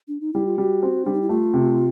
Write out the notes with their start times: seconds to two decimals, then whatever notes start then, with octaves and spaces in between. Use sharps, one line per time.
0.08 D4
0.21 D#4
0.33 G3 E4
0.46 F4
0.58 G3 F#4
0.83 C4
1.05 G3 D4
1.13 D#4
1.22 E4
1.29 A3 F4
1.53 C3